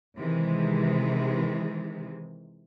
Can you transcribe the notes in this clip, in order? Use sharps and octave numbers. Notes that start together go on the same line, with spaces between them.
C3 D#3 E3 G#3